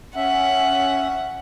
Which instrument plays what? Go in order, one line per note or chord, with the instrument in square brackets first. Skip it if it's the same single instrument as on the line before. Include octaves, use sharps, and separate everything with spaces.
[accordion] C#4 E5 [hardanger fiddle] F#5